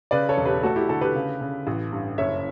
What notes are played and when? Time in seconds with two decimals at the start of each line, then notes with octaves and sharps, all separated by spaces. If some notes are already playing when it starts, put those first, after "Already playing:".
0.11 C#3 B4 D5
0.29 A4 C#5
0.37 E1
0.45 G4 B4
0.63 A3 F#4 A4
0.76 E4 G4
0.89 D3 F#4 A4
1.01 G4 B4
1.15 C#3
1.41 C#3
1.67 A1
1.92 G2
2.18 F#1 C#5 E5